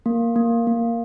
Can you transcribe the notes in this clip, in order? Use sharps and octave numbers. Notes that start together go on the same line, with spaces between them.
A#3
A#3
A#3